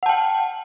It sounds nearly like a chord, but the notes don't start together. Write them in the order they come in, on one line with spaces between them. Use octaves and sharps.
F#5 A5 G5